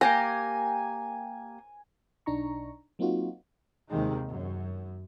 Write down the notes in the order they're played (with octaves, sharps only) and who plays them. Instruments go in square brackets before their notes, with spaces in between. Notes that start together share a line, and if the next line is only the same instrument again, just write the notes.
[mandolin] A#3 G4 A#5 [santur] G#5
[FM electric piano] B1 D4 D#4 A#5 C#6
F#3 A#3 C4 D#4 F4 F#4
[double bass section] D#2 C3 D#3 G#3
F#2